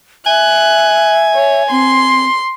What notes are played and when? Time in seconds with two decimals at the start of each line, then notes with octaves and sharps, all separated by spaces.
0.26 E5 G#5 F#6
1.34 C#5
1.71 C4 C6